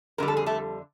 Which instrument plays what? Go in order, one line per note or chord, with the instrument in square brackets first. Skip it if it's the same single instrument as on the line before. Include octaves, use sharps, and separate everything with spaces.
[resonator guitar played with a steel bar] F2 D3 G3 A#4
A4
G#4
A3 A4